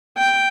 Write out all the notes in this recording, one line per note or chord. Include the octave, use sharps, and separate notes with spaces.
G5